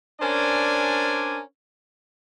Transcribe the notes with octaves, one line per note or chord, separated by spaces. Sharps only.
C#4 D4 A#4 C5 D5 G#5